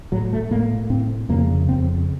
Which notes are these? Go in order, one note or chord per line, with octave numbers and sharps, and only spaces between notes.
A2 F#3
A3
A2 A#3
A2 C4
F2 C#3 A#3
F2 C#3 C4